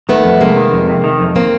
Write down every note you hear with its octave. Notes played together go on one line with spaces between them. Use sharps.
D#3 A3 B3
F2
C3 G#3 A#3
D#3
F2
C3
D#3
F2
A#3 C4